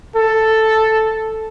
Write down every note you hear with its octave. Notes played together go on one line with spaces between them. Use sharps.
A4